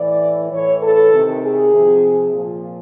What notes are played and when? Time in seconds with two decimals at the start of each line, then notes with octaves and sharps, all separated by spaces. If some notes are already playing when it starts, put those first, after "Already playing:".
Already playing: A2 E3 D5
0.51 A2 E3 C#5
0.81 A4
1.12 C3 D#3
1.42 G#4
1.73 C3 F3
2.33 A#2 F3